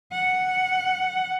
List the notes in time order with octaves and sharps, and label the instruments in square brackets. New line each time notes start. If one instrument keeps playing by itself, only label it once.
[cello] F#5